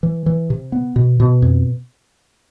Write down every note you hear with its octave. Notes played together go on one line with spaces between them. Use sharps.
E3
E3
C3
B3
B2
B2
F2